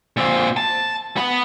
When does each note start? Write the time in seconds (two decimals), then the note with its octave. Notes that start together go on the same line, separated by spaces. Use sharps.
0.17 A#2 C4
0.57 A5
1.16 B3 B5